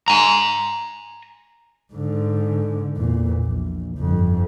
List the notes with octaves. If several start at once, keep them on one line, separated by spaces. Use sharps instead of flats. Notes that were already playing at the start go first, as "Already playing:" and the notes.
G#5 A#5
G#2 D3
E2 A#2
A#1
G1 F2